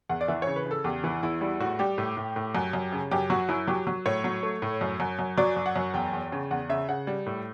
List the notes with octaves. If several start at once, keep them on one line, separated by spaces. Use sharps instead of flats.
E2 F#5
D5
E3 E5
C#3 C#5
B4
C#3 A4
E2 G4
E3 E4
E2 E4
G3 E4
A2 F#4
G3 G4
A2
A2
A2
F#2
F#2
C#3
F#2 G4
F#3 F#4
F#2 E4
F#3 G4
F#3
A2 C#5
F#3
A3
A2
F#2
F#2
F#2
F#3 D5
F#2
F#5
F#2
E2 G5
E2
C#3
E2 F#5
C#3 E5
C#3 F#5
G3
A2